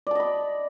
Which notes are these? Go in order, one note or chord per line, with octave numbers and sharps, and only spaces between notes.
D5 D#5 A5 B5